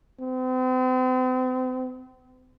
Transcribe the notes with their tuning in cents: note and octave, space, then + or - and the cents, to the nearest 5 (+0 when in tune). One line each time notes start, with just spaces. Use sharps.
C4 -40